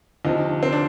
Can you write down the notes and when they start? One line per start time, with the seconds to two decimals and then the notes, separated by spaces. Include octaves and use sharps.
0.25 D2 C3 F3 D#4
0.63 C4
0.73 D4